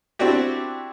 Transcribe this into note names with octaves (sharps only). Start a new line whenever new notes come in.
C4 D4 E4 F#4 G4